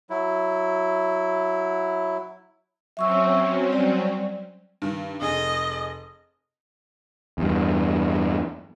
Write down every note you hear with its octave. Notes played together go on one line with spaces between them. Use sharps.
F#3 E4
F#3 C4 C#4 E5 C#6 E6
G3 D5
G2 D#3
F1 G#4 D#5
E2 G2